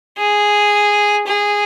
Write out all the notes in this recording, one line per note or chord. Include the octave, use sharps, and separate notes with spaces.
G#4
G#4